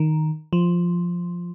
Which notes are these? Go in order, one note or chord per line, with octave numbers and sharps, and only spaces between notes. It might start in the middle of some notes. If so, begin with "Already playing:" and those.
Already playing: D#3
F3